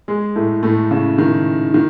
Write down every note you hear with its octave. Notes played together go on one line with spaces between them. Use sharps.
G#3 G#4
A2 A3
A2 A3
C#3
D#3
D#3